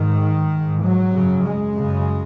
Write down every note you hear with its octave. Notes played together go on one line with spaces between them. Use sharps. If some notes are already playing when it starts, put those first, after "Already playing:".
Already playing: G#2 D#3
G#2
F#3
F#2 C#3
G#3
F#2 C#3